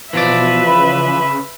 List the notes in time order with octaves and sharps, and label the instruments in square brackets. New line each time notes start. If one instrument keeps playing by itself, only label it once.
[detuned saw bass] B2 [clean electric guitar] E3 F3 D5 [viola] B4 E5
[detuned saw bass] C#3 [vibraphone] B5